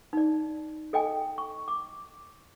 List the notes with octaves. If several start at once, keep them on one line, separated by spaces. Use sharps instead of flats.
D#4 D5
A4 D#5 G5 G#5
C#6
D6